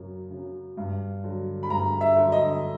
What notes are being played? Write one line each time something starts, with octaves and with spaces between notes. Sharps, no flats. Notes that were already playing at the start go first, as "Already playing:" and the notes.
Already playing: F#2 C#3 F#3
C#3 F#3
G2
D3 F#3
B5
G2 A#5
E5
D3 F#3
D#5